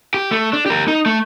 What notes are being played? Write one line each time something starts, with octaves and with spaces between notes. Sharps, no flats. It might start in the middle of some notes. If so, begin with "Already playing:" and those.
G4
A3
D4
G4 A#4
D#4
A3